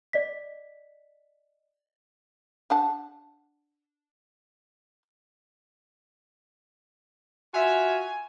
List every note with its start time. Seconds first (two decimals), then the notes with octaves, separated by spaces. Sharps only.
0.13 D5 D#5 B6
2.70 D4 F#5 A5
7.54 F4 F#4 E5 G#5